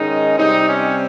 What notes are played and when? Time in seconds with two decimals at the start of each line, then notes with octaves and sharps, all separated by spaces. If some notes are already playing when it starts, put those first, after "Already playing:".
Already playing: G#2 D#3 G#3 C#4 D#4
0.38 C3 G3 C4 D#4
0.69 C#4